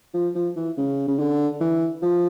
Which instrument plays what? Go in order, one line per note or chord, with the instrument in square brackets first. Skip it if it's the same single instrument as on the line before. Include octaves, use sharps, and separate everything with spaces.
[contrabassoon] F3
F3
E3
C#3
C#3
D3
E3
F3